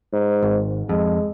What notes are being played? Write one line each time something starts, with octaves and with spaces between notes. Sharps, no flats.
G#2
G#1
F2 G#3